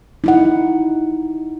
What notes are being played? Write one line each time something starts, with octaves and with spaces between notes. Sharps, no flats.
D#4 E4 F#5